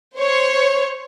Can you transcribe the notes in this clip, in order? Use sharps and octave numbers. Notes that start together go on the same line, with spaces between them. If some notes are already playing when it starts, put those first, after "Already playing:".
C5 C#5